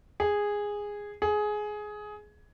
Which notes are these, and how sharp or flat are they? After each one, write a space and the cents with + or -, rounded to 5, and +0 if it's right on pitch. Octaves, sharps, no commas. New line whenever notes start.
G#4 -10
G#4 +15